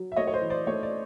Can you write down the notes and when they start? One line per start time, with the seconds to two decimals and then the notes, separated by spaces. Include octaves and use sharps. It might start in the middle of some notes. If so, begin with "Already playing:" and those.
Already playing: F#3
0.12 E5
0.16 A3 C#5 D#5
0.27 C#5
0.34 C5
0.41 E3
0.50 C5 D5
0.67 A3 C#5
0.83 D5